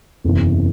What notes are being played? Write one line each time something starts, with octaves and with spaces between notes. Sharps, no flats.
F#1 E2 C3 E3